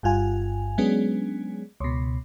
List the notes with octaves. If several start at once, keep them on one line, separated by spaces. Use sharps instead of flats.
G1 G2 F4 G#5
F#3 G#3 B3 C#4 D4 G#4
C#2 B2